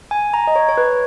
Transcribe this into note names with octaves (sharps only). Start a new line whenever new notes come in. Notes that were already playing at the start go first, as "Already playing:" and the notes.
G#5
A#5
D#5
C#5
C#5
B4